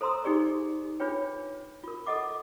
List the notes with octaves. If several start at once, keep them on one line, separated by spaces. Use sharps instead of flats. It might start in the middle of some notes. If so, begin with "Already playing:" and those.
A4 C5 A#5 C6 D#6 E6
D#4 G4 G#4 D5 C#6
D4 F4 G#4 B4 C#5 G5
F4 A#4
A4 A#4 D#5 F#5 D6